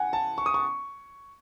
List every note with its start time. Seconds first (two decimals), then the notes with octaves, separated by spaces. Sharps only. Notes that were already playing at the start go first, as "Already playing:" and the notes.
Already playing: F#5 G#5
0.13 A5
0.38 C#6
0.46 D#6
0.54 C#6